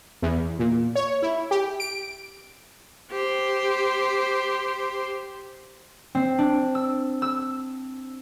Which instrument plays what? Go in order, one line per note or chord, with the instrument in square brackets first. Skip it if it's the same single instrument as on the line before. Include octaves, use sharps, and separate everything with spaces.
[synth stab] E2
A#2
C#5
E4
G4
D7
[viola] G4 C5
[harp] C4
D4
E6
E6